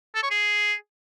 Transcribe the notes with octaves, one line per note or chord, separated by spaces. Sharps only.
A4
C#5
G#4